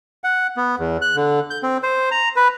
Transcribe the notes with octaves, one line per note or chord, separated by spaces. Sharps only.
F#5
B3
E2
F#6
D3
G6
C4
C5
A#5
B4